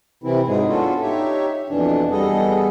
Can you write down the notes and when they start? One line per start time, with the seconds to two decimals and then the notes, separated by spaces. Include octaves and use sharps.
0.24 C3 E3 C4 E4
0.48 G#2 F#3 G#3 G#4
0.68 B3 C#4 D4 F4 F#4 A4
1.02 D#4 G4 C#5 E5
1.69 F2 B2 E3 D4
2.11 E2 G3 B3 G#4 A4 D#5